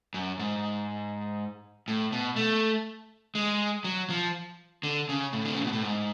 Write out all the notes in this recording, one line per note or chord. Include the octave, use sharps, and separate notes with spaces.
F#2
G#2
A2
B2
A3
G#3
F#3
F3
D3
C#3
A2
D3
C#3
B2
A2
G#2